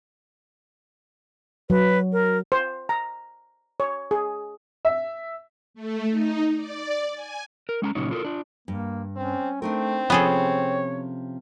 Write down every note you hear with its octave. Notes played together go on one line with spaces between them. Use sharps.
F#3 B4
A#4
C5
A#5
C#5
G#4
E5
A3
D#4
D5
G#5
A#4
G#3 C#4 F#5 A#5
A#2 C#3 F#3 C#4 D#4
F4 A4 A#4
D4 F4
G2 A#3
C4 C#4
A3 C4 D4 D#4 A#4
C3 F3 B3 C#4 G#4 A4 C#5